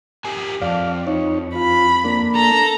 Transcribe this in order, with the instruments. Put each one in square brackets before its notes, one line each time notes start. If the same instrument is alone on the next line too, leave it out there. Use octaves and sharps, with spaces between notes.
[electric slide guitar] G4 A#4 G#5
[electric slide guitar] F2 [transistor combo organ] D5 F5
[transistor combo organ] D#4 C#5
[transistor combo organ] F4 [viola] B5
[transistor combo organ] A#3 D4
[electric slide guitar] A4 [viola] A#5